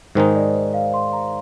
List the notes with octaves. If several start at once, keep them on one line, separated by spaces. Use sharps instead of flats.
G#2 D#3 G#3 D#4 C5
D5
F5
C6
A#5